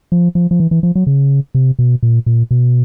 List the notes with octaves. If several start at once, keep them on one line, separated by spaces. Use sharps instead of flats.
F3
F3
F3
E3
E3
F3
F#3
C#3
C3
B2
A#2
A#2
B2